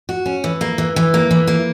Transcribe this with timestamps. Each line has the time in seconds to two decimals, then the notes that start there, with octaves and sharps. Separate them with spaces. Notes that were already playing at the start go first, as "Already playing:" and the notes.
0.09 F#4
0.26 C#4
0.44 E3
0.61 A#3
0.78 E3
0.96 E3
1.14 A#3
1.31 E3
1.47 A#3